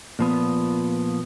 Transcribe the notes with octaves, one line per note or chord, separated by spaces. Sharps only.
A#2 F3 B3